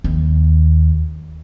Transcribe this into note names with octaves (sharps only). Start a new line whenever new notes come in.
D#2